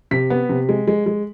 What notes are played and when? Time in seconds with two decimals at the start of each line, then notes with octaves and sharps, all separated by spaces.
0.11 C3 B6
0.30 B3
0.49 C3
0.69 G#3
0.88 G#3
1.06 G#3